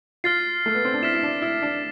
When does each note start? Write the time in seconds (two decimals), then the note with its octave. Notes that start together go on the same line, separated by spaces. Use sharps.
0.24 F4 F6 A6 C7
0.66 A3
0.74 B3
0.85 C4
0.94 D4
1.02 E4 F6 B6 E7
1.14 E4
1.23 D4
1.42 E4
1.62 D4